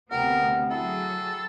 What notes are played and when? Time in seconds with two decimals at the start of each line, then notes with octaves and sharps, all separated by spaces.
0.11 D2 C3 B3 A#4 F#5 G5 A#5
0.71 F#3 E4 F#4 G#4 A4